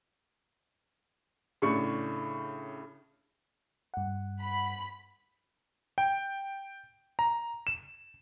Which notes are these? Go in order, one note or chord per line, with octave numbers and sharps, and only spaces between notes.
A2 C#3 D4 C#6 C#7
G2 F#5
B5
G5
A#5
E7